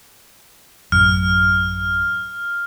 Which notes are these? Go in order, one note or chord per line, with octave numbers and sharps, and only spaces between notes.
A1 F#2 F6